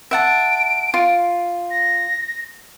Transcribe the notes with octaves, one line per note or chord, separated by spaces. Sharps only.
E5 F#5 A5 D7
F4
A#6